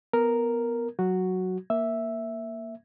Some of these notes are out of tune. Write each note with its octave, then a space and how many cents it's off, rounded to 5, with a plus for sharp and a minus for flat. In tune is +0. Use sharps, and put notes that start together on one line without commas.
B3 +0 A#4 +0
F#3 +0 F#4 +0
A#3 +0 E5 +0